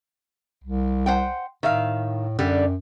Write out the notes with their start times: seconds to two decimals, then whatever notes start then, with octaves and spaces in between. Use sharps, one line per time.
0.64 C2
1.06 C5 F#5 G5
1.63 A2 D#3 E5 F5
2.39 F#2 D3 G3 G4